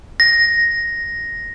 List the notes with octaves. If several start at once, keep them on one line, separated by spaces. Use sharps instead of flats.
A#6